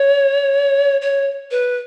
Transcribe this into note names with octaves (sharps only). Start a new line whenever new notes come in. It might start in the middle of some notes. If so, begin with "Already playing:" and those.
Already playing: C#5
C#5
B4